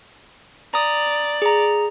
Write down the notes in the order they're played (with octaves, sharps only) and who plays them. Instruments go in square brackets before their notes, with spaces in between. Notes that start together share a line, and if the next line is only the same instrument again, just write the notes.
[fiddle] D5 [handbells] A#5 D#6
[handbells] G#4 A#5